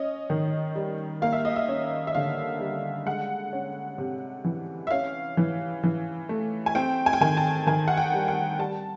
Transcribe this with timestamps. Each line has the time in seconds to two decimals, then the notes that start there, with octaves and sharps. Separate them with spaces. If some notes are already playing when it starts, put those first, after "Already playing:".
Already playing: C#4 D#5
0.30 D#3
0.75 G3
1.22 A#3 F5
1.33 E5
1.45 D#5
1.56 E5
1.69 C#4
2.07 E5
2.15 D3 F5
2.60 G3
3.06 G#3 F#5
3.53 C#4
3.98 C3
4.45 E3
4.87 E5
4.91 C#4 F5
5.37 E3
5.83 E3
6.29 A3
6.66 G#5
6.75 C4 G5
7.06 G#5
7.13 G5
7.21 D#3 G#5
7.37 A5
7.67 D#3 G#5
7.88 F#5
7.97 G5
8.14 G3
8.28 G5
8.59 G3 A5